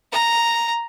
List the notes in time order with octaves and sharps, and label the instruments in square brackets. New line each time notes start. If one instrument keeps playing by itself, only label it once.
[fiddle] A#5